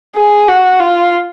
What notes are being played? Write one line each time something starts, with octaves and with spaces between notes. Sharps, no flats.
G#4
F#4
F4